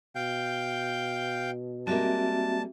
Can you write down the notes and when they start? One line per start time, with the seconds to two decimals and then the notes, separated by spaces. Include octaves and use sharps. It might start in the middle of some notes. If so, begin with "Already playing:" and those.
0.16 B2 F5 G5 G6
1.87 G3 G#3 A#3 C4 F#4 E5 A5